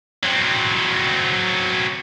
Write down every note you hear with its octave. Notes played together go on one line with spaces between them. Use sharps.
F#3 C4